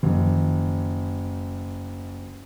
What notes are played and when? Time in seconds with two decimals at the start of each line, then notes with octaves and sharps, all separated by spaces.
0.03 F#1 D#3 F3